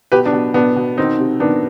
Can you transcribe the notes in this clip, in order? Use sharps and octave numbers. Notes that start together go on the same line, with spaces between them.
B2 G4 B4
B3 D4
B2
B2 B3 D4
B2
D#3 C4 D#4
C3
D#3 B3 D4